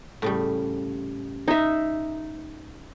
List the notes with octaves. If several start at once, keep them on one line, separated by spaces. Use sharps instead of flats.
A2 C#3 G3
D#4 E5